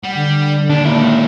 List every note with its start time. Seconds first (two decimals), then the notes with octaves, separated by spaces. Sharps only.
0.04 G3 F#5
0.15 D3
0.69 D#2 D4
0.85 A#2 E4